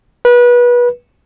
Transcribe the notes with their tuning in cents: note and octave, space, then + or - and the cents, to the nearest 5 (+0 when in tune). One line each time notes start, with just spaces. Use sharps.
B4 -25